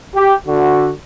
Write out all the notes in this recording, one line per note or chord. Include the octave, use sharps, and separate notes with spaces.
G4
D3 F#4